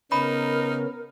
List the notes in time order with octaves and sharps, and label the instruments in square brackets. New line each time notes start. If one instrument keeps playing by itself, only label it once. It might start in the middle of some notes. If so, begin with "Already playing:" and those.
[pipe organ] C#3 B3 C#4 [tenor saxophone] D#4 [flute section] A#4 [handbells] B5